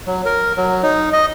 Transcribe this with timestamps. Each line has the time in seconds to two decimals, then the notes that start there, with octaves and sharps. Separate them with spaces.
0.07 F#3
0.25 A#4
0.57 F#3
0.83 D#4
1.13 D#5